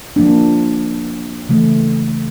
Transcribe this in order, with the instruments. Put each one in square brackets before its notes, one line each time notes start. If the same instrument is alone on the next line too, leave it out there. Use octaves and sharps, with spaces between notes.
[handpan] F3 A#3 D4
C#3 E3 A3